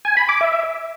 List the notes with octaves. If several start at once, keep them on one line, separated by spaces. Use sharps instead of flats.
G#5
B5
D6
E5